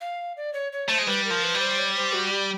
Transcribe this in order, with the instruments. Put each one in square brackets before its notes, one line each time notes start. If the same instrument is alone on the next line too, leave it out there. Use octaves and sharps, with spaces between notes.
[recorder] F5
D5
C#5
C#5
[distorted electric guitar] A3 [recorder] C5
[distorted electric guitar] G#3
[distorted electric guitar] G3 [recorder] B4
[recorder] A#4
[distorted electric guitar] F3
[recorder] B4
[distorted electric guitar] G3
[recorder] C5
C#5
C5
F#4
G4